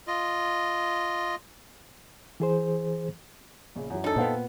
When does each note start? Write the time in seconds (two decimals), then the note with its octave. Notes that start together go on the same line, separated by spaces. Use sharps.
0.07 F4 D#5
2.40 E3 G#4 C5
3.76 A#1 C#3
3.90 F#2 E3 F#3
4.04 F#2 D4 D#4 A4
4.16 A#2 B3 C5 F5 G5